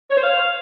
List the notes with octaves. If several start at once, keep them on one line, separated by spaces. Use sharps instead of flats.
C#5
C5
F5